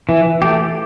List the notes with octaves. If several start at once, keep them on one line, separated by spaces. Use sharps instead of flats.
E3
A3 G4